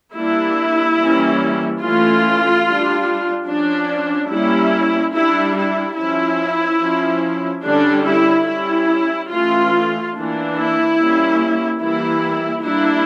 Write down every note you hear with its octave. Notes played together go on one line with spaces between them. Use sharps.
G3 A#3 D4 E4
E3 G3 A#3 C#4
E3 A3 C#4 F4
G3 D4
F3 C#4 D4
G3 A#3 C#4 E4
G3 D4 E4
E4
F3 C#4 E4
F3 C#4
D3 G3 C#4 D4
E4
G3 C#4 E4
E3 A3 C#4 F4
E3 A#3 D4
E4
G3 A#3 C#4
E3 G3 A#3 E4
G3 A#3 D4 E4